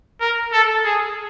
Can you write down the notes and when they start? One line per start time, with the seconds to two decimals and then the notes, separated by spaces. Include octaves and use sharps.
0.20 A#4
0.53 A4
0.85 G#4